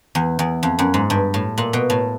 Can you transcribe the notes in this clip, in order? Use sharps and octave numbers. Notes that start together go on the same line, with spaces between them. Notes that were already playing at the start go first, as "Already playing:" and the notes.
E2
E2
F2
F#2
G#2
G2
A2
A#2
B2
A2